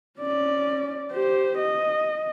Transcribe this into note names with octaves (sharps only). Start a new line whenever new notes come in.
C#4 D5
G4 C5
D#5